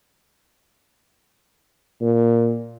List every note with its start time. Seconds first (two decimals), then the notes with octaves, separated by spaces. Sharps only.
2.01 A#2